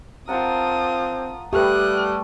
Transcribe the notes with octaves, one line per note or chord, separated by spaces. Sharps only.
C4 F4 A#4 F#5 A5 D#6
G3 A3 G4 A4 B4 D#6 F#6